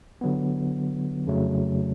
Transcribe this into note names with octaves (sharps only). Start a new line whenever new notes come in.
D3 F#3 B3
F2 C#3 F#3 A3